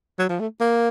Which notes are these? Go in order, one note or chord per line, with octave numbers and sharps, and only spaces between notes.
F#3
F3
A3
A#3